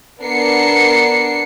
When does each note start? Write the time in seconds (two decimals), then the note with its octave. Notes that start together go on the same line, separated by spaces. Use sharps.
0.22 B3 D4 A#4 C7 C#7